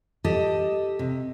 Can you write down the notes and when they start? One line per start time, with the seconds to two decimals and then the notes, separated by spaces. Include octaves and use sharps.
0.24 G4 A4 D#5 A5
0.99 C3